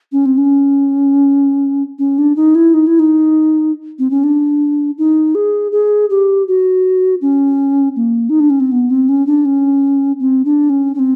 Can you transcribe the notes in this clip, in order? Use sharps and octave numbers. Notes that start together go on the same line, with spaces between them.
C#4
C4
C#4
C#4
D4
D#4
E4
D#4
E4
D#4
C4
C#4
D4
D#4
G#4
G#4
G4
F#4
C#4
A#3
D#4
D4
C#4
C4
B3
C4
C#4
D4
C#4
C4
D4
C#4
C#4
C4